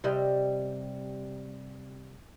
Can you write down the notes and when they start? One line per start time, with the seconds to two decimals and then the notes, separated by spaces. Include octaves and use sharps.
0.04 C3 G3 D#5